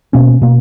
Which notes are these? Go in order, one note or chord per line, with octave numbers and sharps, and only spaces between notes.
B2 A#3 C#4
B2 A#3